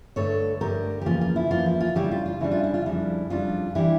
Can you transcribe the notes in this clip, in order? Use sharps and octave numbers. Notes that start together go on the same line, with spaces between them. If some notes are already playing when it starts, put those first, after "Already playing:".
G2 D3 A3 A4 C#5
G2 D3 A3 G4 A#4
G4
E2 C#3 F3 A#3 F4
F4
E4
E2 C#3 F3 A#3 F4
E4
F4
C#3 G3 D4 E4 G4
F4
F4
C#3 G3 D4 E4
F4
E4
F4
F2 C#3 G3 D4 E4
F2 C#3 G3 D4 F4
E3 G3 D4 E4 G4